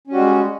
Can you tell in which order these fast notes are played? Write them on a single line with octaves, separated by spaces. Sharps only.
C#4 G3 F#4 G#3